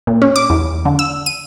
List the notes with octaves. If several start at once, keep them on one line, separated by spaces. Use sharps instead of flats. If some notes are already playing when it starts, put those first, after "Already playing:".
A#2
C#4
D6
E2
D3
E6
D#7